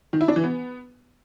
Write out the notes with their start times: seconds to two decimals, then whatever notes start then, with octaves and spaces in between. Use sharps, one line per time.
0.13 D#3
0.21 E4
0.28 D4
0.36 E3
0.44 B3